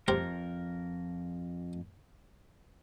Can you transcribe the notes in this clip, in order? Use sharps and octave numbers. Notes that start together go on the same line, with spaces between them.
F2 G4 A#4 C5 G5